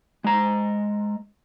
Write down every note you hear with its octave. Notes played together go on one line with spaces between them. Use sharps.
G#3 A#5